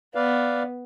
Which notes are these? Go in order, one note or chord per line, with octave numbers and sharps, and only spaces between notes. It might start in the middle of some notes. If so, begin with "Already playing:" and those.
B3 B4 D5 F5